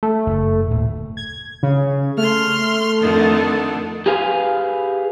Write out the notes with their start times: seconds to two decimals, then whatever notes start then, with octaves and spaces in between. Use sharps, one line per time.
0.03 A3
0.27 F#1
0.71 D1 A#2
1.17 G#6
1.63 C#3
2.17 A3 C6 F6
3.00 F2 D3 D#3
4.06 G4 G#4 B4 F5 G#5